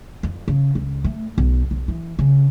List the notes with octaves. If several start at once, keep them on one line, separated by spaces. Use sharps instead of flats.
F2
C#3
C#2
A3
B1
B1
E3
C#3